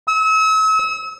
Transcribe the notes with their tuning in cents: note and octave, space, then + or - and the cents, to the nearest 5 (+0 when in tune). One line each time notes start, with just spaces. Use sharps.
E6 -40